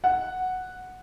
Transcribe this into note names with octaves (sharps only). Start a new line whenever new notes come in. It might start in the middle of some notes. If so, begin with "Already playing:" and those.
F#5